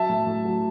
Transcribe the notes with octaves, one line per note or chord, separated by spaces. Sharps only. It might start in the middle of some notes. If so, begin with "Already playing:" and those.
Already playing: F#3 E5 A5
A2
A2
F#3